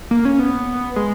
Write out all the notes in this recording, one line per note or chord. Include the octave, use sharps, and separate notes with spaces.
A#3
C#4
B3
G#3